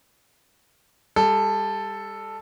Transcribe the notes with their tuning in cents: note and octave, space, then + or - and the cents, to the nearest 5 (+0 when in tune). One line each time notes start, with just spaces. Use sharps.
G3 +30 A4 +0